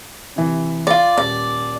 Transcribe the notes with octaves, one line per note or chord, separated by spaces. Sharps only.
C3 E3
F4 D5
D#1 D5